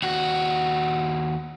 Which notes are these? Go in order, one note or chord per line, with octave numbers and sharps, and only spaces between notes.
D#2 F#4